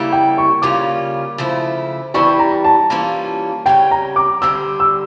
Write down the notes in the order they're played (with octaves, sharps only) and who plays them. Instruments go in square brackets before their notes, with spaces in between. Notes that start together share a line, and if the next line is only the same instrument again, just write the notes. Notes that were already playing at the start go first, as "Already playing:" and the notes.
Already playing: [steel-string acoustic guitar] C#3 G3 A#3 E4 G4
[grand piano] G5
C#6
[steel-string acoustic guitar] C#3 G3 A#3 C#4 F4 [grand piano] D6
[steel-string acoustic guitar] C#3 F3 A3 E4
[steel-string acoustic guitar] E2 E3 G3 D4 G4 [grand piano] C#6
[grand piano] A#5
A5
[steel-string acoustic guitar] E3 G3 A#3 C#4 F4
[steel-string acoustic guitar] C#3 G3 C#4 [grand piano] G5
[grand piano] A#5
D6
[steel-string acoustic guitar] G2 D3 G3 [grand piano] E6
[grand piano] E6